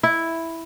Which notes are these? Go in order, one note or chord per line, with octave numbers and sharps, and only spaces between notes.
E4